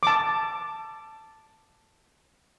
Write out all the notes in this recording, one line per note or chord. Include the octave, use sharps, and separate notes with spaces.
A5 D6